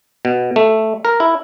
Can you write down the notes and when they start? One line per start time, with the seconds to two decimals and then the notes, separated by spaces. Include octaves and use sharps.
0.25 B2
0.56 A3
1.05 A#4
1.20 E4